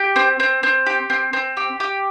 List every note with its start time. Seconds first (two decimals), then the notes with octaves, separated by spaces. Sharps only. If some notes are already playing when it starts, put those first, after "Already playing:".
Already playing: G4
0.16 C4
0.40 C4
0.63 C4
0.86 G4
1.10 C4
1.33 C4
1.57 G4
1.80 G4